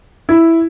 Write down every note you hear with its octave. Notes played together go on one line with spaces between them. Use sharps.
E4